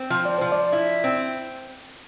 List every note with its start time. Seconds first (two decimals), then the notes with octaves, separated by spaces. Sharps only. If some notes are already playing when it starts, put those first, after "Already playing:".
Already playing: C4
0.10 F3
0.25 D5
0.38 F3 C5
0.52 D5
0.73 E4
1.04 C4